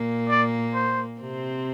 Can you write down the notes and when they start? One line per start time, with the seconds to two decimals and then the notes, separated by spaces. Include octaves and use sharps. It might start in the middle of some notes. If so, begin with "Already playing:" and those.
Already playing: A#2 A#3
0.29 D5
0.74 C5
1.20 C3 C4